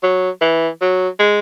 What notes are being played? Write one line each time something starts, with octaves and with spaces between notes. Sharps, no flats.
F#3
E3
F#3
G#3